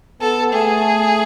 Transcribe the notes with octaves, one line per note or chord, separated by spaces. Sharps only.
B3 A4
A3 G#4